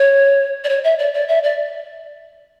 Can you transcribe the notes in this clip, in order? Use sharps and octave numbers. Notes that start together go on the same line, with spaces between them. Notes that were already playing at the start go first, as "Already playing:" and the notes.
Already playing: C#5
D5
C#5
E5
D5
D5
E5
D5